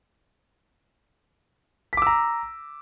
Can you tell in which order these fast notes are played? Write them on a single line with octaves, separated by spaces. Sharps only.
B6 D6 E6 A#5